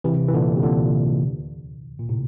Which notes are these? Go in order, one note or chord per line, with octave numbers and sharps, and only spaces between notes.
C3 E3
E3
A#2 D3
C3
A#2 D3
A#2
A2 C3